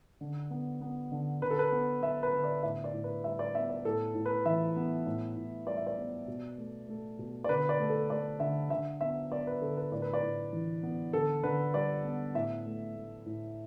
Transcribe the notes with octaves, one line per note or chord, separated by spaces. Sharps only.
D3
B3
B3
D3
D3 B4
A4
B4
B3
B3 E5
B4
D3
D5
A2 E5
D5
A2
B4
G3 E5
D5
B3 E5
D5
A2 A4
A2
B4
E3 E5
B3
A2
A2
G3 D5
E5
D5
B3
B2
A3
A3
B2
D5
D3 B4
D5
A3
A4
A3 D5
D3 E5
D3 E5
B3 E5
B3 D5
B4
D3 A4
B4
A2 D5
B4
D5
A2
E3
B3
D3 A4
D3 B4
G3 D5
B3
A2 E5
A3
A3
A2